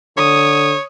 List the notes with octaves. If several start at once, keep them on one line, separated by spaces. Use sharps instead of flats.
D3 C#5 D#6